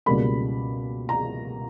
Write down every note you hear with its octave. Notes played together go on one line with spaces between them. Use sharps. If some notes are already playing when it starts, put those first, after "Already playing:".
C#2 B2 G3 A#3 B5
A#5